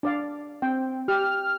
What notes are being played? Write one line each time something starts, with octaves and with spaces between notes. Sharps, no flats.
D4 D5 F5
C4 G5
G4 F6